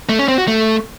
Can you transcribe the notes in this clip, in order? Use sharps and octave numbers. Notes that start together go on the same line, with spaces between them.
A3
C#4
C4
F#4
A3